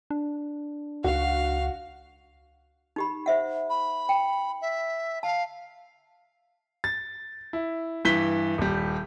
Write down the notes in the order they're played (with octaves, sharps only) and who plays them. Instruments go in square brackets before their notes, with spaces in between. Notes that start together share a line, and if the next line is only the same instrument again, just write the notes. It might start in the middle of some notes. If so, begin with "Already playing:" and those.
[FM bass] D4
[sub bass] C#2 [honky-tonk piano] F#4 [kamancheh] F5
[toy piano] D#4 G4 B5
C5 E5 F#5
[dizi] B5
[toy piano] G5
[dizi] E5
[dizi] F5 [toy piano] A5
[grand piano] A6
E4
G2 E3 B6 G7
D#1 G3